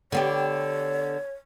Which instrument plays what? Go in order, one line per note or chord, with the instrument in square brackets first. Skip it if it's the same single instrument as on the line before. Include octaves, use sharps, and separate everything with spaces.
[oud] D3 B3 G4 [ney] C#5